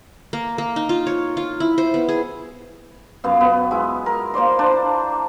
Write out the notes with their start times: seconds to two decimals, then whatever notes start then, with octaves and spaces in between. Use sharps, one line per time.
0.33 A#3
0.58 A#3
0.76 D#4
0.89 F4
1.07 C#5
1.37 F4
1.60 E4
1.78 C5
1.94 B3
2.09 G#4
3.24 F#2 B3 F5
3.41 B3
3.71 G#3 E4
4.06 A#4
4.34 A#3 C5 D5 C6
4.59 D4 C5